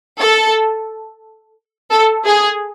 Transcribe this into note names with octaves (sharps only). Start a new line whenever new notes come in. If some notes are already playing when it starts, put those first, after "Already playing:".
A4
A4
G#4